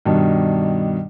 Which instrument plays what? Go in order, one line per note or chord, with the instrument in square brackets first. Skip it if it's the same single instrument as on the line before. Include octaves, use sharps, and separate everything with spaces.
[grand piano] G2 B2 D#3 D4